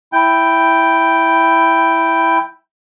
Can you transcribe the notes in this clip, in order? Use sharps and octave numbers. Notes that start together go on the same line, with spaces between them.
E4 G5